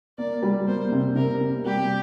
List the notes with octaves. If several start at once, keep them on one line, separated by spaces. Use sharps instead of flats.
A#3 D5
G3
A#3 C5
C3
C3 A#4
C3
G3 G4